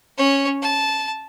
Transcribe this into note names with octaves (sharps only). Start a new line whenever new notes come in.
C#4 C#5
A5